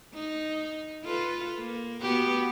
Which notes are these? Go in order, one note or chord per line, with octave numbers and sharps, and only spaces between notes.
D#4
F4 A4 B4
A#3
B3 F#4 G4